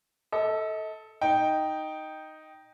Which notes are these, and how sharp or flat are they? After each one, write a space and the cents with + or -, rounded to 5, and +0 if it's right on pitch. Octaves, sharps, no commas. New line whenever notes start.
A4 +0 D#5 +40
D#4 +0 G5 -5